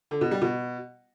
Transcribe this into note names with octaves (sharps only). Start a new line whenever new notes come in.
D3
B2
G3
B2